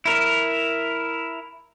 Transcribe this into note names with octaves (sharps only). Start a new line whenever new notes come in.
E4 A#4